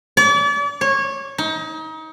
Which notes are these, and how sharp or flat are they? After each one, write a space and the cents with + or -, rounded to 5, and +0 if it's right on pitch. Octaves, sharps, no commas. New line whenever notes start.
D5 -40
C#5 -20
D#4 +30